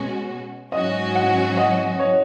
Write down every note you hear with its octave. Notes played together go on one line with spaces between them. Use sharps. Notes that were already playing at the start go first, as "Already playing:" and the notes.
Already playing: B2 G#3 C#4 F#4
G#2 F#3 C#4 F#4 D#5
F#5
D#5
C#5